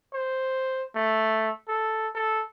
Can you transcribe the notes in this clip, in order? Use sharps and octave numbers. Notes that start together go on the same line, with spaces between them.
C5
A3
A4
A4